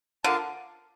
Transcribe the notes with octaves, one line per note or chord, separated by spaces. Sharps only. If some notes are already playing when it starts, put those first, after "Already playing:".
D3 F4 A#4 F5 A5